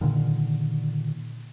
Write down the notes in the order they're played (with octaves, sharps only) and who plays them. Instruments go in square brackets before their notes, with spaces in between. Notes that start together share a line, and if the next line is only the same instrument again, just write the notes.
[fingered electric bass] A#2 D3 D#3